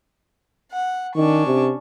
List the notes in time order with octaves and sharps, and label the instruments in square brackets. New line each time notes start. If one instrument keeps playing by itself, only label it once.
[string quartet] F#5
[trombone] D#3 [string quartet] C#4 D4 C#6
[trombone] C3